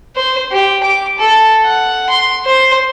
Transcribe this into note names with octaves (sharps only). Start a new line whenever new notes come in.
C5
G4
D6
A4
F#5
C6
C5